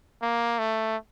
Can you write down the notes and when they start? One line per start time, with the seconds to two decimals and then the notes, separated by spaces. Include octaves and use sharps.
0.22 A#3
0.59 A3